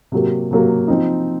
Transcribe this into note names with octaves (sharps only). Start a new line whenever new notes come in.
C3 F#3 A#3
C3 F#3 A#3
F3 C4 D#4